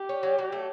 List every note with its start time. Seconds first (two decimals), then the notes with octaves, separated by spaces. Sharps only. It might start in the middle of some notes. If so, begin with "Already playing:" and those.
Already playing: G4
0.09 C#4
0.23 F#3
0.39 F#3
0.52 A3